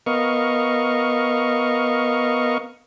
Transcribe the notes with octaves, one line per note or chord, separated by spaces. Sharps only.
B3 A#4 D#5 F5 C#6